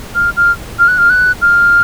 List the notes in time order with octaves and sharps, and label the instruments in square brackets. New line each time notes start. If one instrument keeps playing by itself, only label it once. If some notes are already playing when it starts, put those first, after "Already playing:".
[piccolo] F6
F6
F6
F#6
F6
F#6
F6